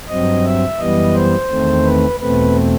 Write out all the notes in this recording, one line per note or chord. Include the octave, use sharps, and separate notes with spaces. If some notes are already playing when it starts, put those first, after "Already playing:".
G2 F#3 C4 D#5
E5
F#2 E3 G3 B3 D#5
C5
E2 D#3 A3 C4
B4
E2 B2 A3 C4 B4